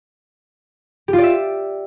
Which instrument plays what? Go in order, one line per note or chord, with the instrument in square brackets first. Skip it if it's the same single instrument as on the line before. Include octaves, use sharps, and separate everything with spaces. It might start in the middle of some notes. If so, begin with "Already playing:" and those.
[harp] G4
F4
D5
E5